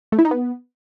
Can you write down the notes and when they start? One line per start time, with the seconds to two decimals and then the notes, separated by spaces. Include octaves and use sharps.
0.12 A3
0.19 E4
0.25 D#4
0.31 B3